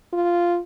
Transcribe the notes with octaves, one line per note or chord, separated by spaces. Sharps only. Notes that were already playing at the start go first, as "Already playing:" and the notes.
F4